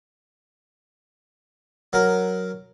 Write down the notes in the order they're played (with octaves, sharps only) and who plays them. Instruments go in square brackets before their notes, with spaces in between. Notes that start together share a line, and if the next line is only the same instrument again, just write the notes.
[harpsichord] F#3 A#4